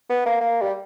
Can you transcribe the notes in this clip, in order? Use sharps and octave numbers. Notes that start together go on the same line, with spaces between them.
B3
A#3
A#3
G3